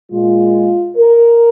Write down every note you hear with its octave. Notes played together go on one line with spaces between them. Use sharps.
A#2 G#3 F4
A#4